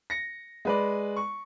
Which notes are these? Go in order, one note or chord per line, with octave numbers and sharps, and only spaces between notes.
A#6 C#7
G#3 B4 D5
C#6